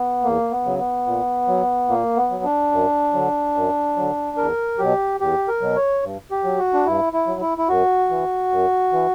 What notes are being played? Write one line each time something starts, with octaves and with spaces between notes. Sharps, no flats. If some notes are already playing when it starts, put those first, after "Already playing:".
Already playing: B3
E2 A#3
B3
C#3 F#3
B3
A#2
F#3
A#2 A#3
B3
F#3
D4
F#2
D3 F#3
F#2
D3 F#3
E2 A#4
B2 F#3 G4
E2 G4
A#4
B2 F#3
C#5
G2
G4
F#3
F#4
D4
G2 E4
E4
F#3
E4
E4
F#2 F#4
E3
F#2
E3